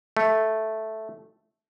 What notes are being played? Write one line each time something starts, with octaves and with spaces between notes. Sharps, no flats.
A3